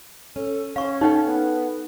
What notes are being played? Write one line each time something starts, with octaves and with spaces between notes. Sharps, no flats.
C#4 A4
C#4 C5 C#5 F5 C#6
D#4 A4 C#5 F5 G5
B3